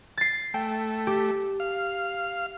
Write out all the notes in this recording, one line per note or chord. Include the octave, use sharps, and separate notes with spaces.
A6 C7
A3 G5
G4
F5